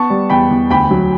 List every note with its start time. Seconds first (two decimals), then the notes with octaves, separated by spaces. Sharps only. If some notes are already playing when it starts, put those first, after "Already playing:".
Already playing: B3 A5 C#6
0.10 G3
0.30 E2 G5 B5
0.51 E2
0.70 D2 G5 B5
0.91 F#3